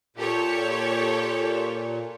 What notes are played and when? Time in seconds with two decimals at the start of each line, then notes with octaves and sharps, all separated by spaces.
0.16 A#2 G4 A4 C#5